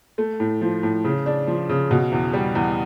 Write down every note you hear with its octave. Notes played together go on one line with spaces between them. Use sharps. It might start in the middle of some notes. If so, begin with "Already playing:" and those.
A3
A2
F3
A2
C#3
D4
F3
C#3
B2
E2
G3
E2